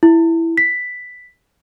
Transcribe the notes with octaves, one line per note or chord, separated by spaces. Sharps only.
E4
B6